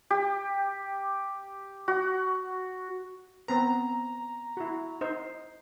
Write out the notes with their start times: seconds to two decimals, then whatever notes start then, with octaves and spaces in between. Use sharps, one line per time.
0.10 G4
1.88 F#4
3.48 B3 C4 B4 A#5
4.57 E4 F#4
5.01 D#4 C5